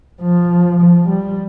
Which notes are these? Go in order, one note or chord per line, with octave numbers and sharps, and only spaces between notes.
F3
F3
G3